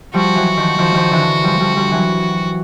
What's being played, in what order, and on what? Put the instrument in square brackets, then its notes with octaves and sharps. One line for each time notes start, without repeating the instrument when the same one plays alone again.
[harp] F3 G3 [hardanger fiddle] F#4
[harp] E3 F#3
D#3 F3
D#3 F3
D#3 F3
D3 E3
F3 G3
F3 G3
F3 G3
E3 F#3